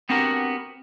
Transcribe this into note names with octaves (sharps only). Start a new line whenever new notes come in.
B3 C4 D4 F#4 G4 A#4